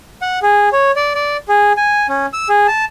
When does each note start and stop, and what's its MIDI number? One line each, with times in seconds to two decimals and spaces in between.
0.22 0.39 78
0.42 0.69 68
0.72 0.92 73
0.96 1.13 74
1.15 1.37 74
1.49 1.73 68
1.77 2.07 80
2.09 2.26 61
2.33 2.48 88
2.49 2.67 68
2.68 2.85 81